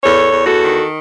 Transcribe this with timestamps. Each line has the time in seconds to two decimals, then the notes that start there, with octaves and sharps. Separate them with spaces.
0.03 E2 A4 C#5
0.32 E2
0.46 F#4 A4
0.61 D#3